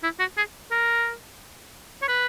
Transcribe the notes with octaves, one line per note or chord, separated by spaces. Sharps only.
E4
F#4
G#4
A#4
C#5
B4